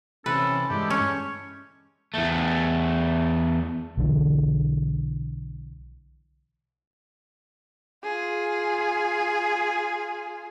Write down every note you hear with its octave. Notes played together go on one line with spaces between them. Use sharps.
C3 E3 C#4 A4 B4
G2 E3 G#3 A3 G4
C#4 C#5
E2 A3
B1 D3 E3
F4 G#4